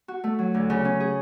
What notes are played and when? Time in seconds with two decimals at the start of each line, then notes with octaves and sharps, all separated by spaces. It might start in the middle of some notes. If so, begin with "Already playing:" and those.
0.08 F#4
0.24 A3
0.39 F#3
0.54 D2
0.70 C#3
0.85 C#4
1.00 G#4